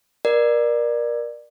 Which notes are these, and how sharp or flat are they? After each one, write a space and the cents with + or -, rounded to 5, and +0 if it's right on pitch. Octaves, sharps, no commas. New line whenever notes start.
A#4 +25 D5 +20